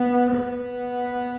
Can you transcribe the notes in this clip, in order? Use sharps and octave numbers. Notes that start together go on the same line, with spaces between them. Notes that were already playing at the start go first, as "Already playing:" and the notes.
Already playing: B3
B3